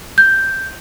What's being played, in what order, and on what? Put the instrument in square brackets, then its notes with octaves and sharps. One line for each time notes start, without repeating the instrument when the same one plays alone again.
[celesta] G6